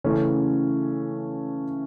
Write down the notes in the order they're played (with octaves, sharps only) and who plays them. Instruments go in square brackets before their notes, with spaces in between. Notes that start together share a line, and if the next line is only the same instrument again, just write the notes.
[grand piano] C#3 E3 A3 C#4